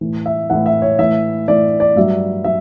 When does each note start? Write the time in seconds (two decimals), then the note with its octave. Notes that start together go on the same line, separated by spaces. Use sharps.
0.01 A2 E3
0.26 E5
0.50 A2 E3 F#5
0.66 E5
0.82 C#5
0.99 A2 E3 E5
1.48 A2 E3 D5
1.80 D5
1.96 G2 F#3 E5
2.44 F#3 E5